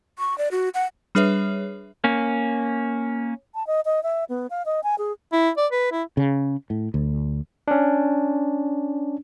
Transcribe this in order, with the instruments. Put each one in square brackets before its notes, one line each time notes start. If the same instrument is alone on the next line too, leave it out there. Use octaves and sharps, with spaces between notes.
[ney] C#6
D5
F#4
F#5
[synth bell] G3 D4 G#4 B4 C#5 E5
[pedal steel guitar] A#3 C#4
[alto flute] A5
D#5
D#5
E5
B3
F5
D#5
G#5
G#4
[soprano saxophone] E4
D5
B4
E4
[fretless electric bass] C#3
A2
D2
[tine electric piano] C#4 D4